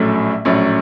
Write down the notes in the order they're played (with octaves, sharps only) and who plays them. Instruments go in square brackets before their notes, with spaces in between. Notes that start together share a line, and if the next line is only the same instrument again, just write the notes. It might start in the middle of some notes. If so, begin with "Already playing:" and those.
Already playing: [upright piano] A#1 A2 F#3 A3 C#4
A#1 A2 F#3 A3 C#4